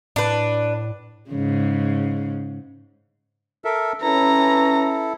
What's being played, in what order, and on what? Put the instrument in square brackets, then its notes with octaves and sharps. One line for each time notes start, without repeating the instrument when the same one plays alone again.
[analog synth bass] A2 [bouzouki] D4 B4
[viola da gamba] G#2 C#3
[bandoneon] A4 A#4 E5
[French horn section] C#4 B4 [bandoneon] E4 A4 [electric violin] A#5